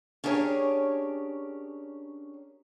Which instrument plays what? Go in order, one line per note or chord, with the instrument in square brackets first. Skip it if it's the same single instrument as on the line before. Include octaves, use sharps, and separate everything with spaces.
[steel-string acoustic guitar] C#4 D4 G4 G#4 A#4 C#5